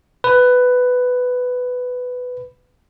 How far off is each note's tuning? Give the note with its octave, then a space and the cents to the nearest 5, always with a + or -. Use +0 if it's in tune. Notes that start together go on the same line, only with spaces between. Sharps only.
B4 +10